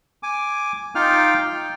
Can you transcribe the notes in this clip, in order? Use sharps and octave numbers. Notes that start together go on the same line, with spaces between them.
G#5 D6
D#4 F4 F5 G5 D6 F6
G5